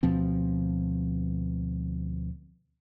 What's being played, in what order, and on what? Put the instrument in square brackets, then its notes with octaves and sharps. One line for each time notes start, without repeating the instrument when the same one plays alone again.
[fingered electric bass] D2 B2 F3 C4